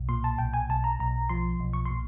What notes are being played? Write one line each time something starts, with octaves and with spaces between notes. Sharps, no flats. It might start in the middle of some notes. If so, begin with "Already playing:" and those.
Already playing: B1
A#2 C6
A5
B1 G5
G#5
B1 A5
A#5
B1 A#5
F3 C6
B1
C#6
C6
A#2